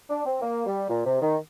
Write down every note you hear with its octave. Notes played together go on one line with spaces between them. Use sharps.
D4
C4
A#3
G3
A#2
C3
D#3